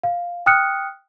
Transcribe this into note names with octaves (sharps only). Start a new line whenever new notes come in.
F5
G5 D#6 F6 F#6 C#7